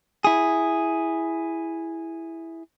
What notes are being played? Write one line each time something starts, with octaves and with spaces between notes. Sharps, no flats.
E4 G#4